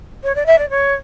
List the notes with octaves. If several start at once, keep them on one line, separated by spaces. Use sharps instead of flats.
C#5
D5
E5
D5
C#5